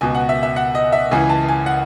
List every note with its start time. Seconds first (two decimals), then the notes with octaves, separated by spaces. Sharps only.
0.01 C#2 B2 G#5
0.15 F#5
0.29 E5
0.43 E5
0.56 F#5
0.75 D#5
0.92 E5
1.11 C#2 C#3 E3 G#5
1.30 A5
1.48 G#5
1.66 F#5